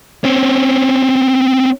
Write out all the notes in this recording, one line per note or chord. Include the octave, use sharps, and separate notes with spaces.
C4 C#4